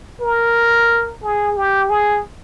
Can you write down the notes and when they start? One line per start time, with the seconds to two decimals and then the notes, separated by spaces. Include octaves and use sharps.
0.21 A#4
1.23 G#4
1.57 G4
1.90 G#4